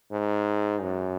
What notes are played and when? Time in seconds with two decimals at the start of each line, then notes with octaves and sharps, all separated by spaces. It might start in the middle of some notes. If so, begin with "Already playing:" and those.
0.12 G#2
0.82 F#2